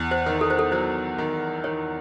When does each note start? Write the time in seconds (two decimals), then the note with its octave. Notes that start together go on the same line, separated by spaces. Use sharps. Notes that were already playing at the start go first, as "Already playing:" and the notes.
Already playing: E2
0.11 C5
0.26 D#3
0.41 A4
0.50 C5
0.59 A4
0.72 F#3 C5
1.18 D#3
1.64 D#3 C#5